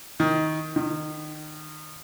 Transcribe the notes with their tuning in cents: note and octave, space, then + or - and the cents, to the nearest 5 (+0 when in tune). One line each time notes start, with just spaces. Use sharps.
D#3 +15
D#3 -25